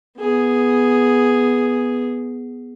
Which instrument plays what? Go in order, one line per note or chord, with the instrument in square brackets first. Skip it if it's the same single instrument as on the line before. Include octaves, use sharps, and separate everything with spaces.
[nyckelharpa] B3 G#4